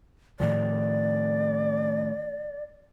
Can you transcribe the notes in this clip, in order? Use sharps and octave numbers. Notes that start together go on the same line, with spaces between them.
A2 D#3 F3 D5